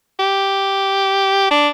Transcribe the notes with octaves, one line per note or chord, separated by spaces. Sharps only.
G4
D4